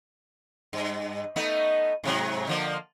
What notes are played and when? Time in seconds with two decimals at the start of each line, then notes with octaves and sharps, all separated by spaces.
0.73 G2
1.36 A3 B3 D#4
2.04 G#2 C3 F#3
2.48 D3 F3 A#3